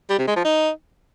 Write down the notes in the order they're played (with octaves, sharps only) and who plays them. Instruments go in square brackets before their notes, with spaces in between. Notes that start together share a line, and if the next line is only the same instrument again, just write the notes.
[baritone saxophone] G3
C3
G#3
F3
D#4